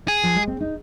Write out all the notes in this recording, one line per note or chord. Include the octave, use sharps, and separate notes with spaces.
G#4
F3
G#3
C4
D#4